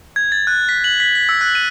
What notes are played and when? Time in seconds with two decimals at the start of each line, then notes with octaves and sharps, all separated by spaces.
0.16 G#6
0.32 A6
0.47 F#6
0.69 B6
0.84 F#7
1.00 B6
1.15 B6
1.29 E6
1.41 F#6
1.55 D#7